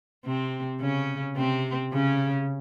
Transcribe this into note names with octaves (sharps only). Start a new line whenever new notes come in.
C3 C4
C#3 C#4
C3 C4
C#3 C#4